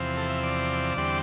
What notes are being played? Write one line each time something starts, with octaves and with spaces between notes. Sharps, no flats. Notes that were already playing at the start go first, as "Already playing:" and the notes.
Already playing: E2 C3 F3 C4
A4
E5
D5
E2 D3 G3 C4